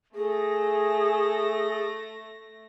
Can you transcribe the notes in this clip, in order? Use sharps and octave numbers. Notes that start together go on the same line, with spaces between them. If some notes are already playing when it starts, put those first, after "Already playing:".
A3 G#4 A#6